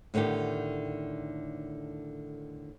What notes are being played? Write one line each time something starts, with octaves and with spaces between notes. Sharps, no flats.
A2 D3 D#3 B3 G4